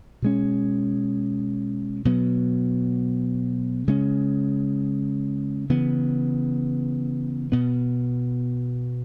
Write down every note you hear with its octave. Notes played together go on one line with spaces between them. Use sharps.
B2 G#3 C#4
B2 F#3 B3
C#3 G#3 C#4
C#3 E3 B3
B2 B3